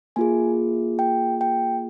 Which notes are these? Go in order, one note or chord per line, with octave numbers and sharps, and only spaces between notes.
A#3 F4 G#4 G#5
G5
G5